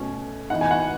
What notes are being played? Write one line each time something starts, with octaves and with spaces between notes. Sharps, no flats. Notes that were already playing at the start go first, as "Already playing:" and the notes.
Already playing: B2 A3 C#4
E3 B3 D#4 F#5
G#5
F#5